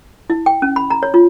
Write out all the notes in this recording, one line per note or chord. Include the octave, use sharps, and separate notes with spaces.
E4
G5
C#4
B5
A#5
C#5
F4